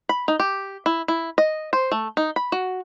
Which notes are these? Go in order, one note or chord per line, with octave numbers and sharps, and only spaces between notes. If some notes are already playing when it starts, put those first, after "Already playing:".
B5
D#4
G4
E4
E4
D#5
C5
A3
D#4
B5
F#4